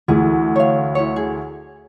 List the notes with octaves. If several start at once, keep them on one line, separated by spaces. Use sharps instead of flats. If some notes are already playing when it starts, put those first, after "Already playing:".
D2 E3 G#4
C#5 F5
E4 C#5
G#4